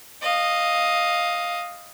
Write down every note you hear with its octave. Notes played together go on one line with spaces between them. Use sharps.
D#5 F5